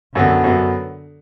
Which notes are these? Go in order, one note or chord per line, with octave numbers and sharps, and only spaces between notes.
F#2 D3 F#3 B3
F#2 F#3 B3